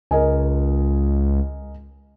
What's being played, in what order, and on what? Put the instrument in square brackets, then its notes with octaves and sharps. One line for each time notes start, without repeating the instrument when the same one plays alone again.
[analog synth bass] C#2 [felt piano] A#4 D#5 G#5